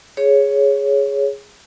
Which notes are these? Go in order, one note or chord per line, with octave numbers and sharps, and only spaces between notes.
G#4 C#5